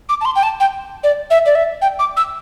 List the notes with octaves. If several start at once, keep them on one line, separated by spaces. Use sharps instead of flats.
D6
A5
C6
G5
A5
G5
D5
E5
D5
E5
G5
D6
E6